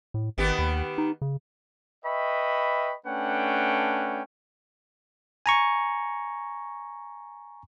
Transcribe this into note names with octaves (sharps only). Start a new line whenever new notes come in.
A2
G#1 D#3 B3 G4
D#2
D#4
C#3
B4 D#5 E5 G5 B5 C#6
A3 C#4 D4 B4 F#5 G5
G#5 A#5 C#6